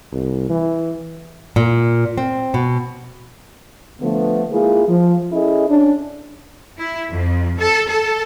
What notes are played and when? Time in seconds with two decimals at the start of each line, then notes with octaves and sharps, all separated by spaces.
0.12 C2
0.50 E3
1.56 A#2
2.18 C4
2.54 B2
4.01 D3 F3 A3 B3
4.51 G#3 A#3 E4 F4 G#4
4.88 F3
5.32 C#4 E4 G#4 A4 D#5
5.69 C#4 D4
6.79 E4
7.10 F2
7.58 A4
7.88 A4